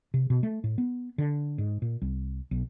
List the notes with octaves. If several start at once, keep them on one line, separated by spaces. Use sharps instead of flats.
C3
B2
A3
A2
B3
D3
G#2
A#2
C2
B1